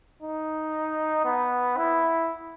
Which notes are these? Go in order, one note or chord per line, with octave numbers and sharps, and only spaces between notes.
D#4
B3
E4